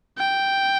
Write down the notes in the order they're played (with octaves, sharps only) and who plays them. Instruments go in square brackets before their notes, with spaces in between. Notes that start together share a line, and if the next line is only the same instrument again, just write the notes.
[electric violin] G5